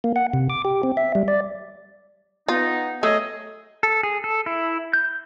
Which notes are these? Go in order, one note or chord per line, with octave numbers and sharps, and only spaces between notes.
A#3
F#5
C3
D6
G4
C4
E5
G3
D5
B3 D#4 F4
F#3 A3 G#4 D#5
A4
G#4
A4
E4
G6